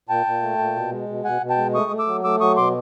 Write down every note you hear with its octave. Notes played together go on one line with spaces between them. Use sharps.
A#2 G5 A5
A#2
A3
A#2
B2
G#3
B2
B2 F#5 G#5
B2
G5 A5
G#3
A3 C#6 D#6
A3
D6 E6
F#3
A3 D6 E6
F#3 C#6 D#6
B2 C6 D6